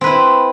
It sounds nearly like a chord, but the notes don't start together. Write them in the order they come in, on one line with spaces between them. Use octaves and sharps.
C4 B4 E4